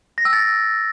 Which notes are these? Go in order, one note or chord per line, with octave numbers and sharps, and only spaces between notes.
A#6
E6
A6